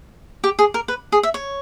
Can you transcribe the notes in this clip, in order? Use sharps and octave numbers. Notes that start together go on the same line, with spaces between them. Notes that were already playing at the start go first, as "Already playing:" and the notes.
G4
G#4
A#4
B4
G#4
E5
C#5